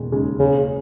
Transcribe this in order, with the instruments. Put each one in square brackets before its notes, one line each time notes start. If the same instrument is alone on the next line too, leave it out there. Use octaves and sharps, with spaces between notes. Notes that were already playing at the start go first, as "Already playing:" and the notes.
Already playing: [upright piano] E1 D#2 C#3 G#3
D#2 C#3 G#3
[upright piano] F#1 [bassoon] C#3